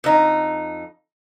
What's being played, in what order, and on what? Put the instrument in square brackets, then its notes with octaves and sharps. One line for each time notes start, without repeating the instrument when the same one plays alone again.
[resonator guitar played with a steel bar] F2 D#4